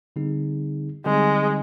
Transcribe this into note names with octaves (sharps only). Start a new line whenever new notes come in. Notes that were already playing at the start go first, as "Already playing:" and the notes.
D3 G3 C4 D#4 G#4
D3 G3 G#3 C4 D#4 G#4